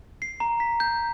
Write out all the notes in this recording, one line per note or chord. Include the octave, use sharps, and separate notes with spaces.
C7
A#5
B6
G6